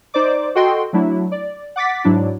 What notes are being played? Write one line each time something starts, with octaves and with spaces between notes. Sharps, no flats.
D#4 C5 D5 D6
F#4 A4 D#5 G5 C6
F#3 A3 D4 E4
D5
F#5 D6 A6 B6
G#2 F#3 D4 E4